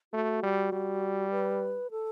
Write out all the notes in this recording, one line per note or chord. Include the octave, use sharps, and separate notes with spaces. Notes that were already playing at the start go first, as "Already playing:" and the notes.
A3 F#4
G3
G3
B4
A4